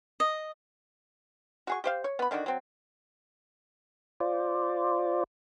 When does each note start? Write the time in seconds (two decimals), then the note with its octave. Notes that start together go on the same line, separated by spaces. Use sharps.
0.20 D#5
1.67 F#4 G#4 C#6
1.84 G4 C5 F5
2.04 C#5
2.19 B3 B5
2.31 D3 D#3 D4 F#4
2.46 F#3 C4
4.20 F4 C5 D5